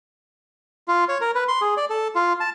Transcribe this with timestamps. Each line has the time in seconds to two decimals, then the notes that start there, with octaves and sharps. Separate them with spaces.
0.88 F4
1.09 C#5
1.21 A#4
1.35 B4
1.48 C6
1.61 G#4
1.77 D5
1.90 A4
2.15 F4
2.40 A5